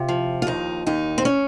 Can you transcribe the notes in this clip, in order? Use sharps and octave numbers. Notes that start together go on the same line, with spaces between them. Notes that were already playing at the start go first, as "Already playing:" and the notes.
Already playing: C3 F4
F3
F4
D#2 D#4
D#2 D#4
C4
C#4